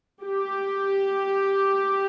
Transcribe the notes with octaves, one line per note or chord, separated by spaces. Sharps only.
G4